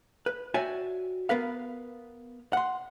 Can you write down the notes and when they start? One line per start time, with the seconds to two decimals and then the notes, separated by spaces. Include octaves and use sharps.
0.26 B4
0.54 F#4 C#5 D5 E5 G5 G#5
1.29 B3 A#4 B4 F5
2.53 F#5 C6